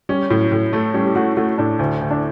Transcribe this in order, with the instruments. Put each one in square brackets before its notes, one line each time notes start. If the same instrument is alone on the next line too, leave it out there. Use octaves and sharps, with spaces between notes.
[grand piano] G3 [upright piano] C#4
[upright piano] A2 [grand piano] F#3
[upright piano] A2
A3
[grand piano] G3 [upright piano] C#4
[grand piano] G4
[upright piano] A3 [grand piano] F#4
[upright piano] A3 [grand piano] F#4
[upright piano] A2 [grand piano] D4
[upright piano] D2
D2
[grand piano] D4